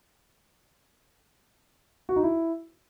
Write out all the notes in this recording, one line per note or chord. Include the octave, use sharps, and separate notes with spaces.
F#4
D#4
E4